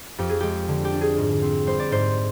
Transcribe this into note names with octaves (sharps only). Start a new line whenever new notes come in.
F2 G4
G#4
G#3 G4
D3
G4
D4
G#4
G#2
C4
G3 C5
D5
G#2 C5